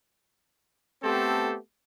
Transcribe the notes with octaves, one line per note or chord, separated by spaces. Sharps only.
A3 B3 C4 G4 A4 C5